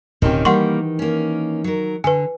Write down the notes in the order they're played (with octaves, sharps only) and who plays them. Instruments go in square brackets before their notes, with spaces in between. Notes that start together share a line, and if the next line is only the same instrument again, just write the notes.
[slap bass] D1 B2 [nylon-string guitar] D#3 G4 [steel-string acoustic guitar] C4 C#4
[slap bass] E3 [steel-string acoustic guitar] G3 A#3 [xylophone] F#5 C6 C#6
[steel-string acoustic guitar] A#3 C#4
F#3 A#4
[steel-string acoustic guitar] D3 [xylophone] B4 G#5